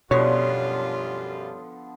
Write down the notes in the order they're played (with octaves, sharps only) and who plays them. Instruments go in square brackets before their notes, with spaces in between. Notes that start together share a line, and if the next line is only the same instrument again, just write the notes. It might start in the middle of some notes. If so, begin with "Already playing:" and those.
[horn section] F#2 G3 F4 [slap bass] B2 [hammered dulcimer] D3 F3 B3 [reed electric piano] C#5